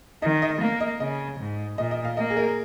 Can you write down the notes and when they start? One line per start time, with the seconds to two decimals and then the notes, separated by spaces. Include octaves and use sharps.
0.22 D#3 D#5
0.42 D#5
0.61 A#3 F5
0.81 D#5
1.00 C#3 D#5
1.40 G#2
1.78 A#2 D#5
1.91 D#5
2.05 F5
2.17 A#3 D#5
2.30 G#4
2.37 A#4